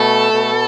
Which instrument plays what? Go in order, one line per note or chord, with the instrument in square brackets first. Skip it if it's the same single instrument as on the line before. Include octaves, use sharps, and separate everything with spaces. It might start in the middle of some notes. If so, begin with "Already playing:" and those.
Already playing: [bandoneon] B2 A3 [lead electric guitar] A4
[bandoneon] B2